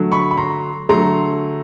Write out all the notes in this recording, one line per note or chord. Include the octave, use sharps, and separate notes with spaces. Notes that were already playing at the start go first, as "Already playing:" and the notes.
Already playing: D3 F#3 A3
B5 C#6
B5
A#5 C6
D3 F#3 A3 A#5 C6